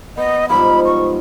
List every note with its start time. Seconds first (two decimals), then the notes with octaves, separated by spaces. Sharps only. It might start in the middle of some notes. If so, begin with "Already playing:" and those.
0.17 B3 D#5
0.49 G#2 F3 G3 B5
0.85 C#6